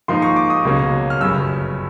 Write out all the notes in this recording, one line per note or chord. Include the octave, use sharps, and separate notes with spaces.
G#2 F3 A#3 D#4 C6
C#6
D6
D#6
C#2 B2 F#3 A#3 C#4
F6
G1 F#2 C#3 E6